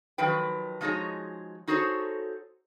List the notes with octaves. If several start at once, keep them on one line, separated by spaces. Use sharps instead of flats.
D#3 F3 F#3 B4 G5
F3 G#3 D#4 F#4 G#4 C#5
D#4 F#4 G#4 A4 C5 C#5